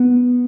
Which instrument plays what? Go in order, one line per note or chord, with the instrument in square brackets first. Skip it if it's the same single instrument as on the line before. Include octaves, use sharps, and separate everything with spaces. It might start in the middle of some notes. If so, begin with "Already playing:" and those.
Already playing: [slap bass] B3